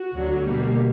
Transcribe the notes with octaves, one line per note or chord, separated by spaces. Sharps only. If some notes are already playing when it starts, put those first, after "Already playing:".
Already playing: F#4
D2 D3 F#3
B2 G3 A#3